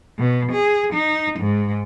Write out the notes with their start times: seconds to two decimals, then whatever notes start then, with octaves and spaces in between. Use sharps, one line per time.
0.18 B2
0.52 G#4
0.94 D#4
1.40 G#2